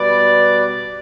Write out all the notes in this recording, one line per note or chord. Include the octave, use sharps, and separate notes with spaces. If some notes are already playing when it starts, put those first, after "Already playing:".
Already playing: B2 G3 B4 D5